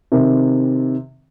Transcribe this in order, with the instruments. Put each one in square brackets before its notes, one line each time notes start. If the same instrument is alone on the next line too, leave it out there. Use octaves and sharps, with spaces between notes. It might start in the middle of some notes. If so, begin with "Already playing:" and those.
[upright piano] C3 D#3